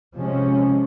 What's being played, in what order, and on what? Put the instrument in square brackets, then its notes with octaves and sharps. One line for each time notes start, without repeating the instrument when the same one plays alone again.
[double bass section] C3 F3 G#3 C#4